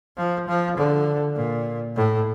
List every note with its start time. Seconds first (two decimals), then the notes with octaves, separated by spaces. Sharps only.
0.17 F3
0.48 F3
0.77 D3
1.36 A#2
1.96 A2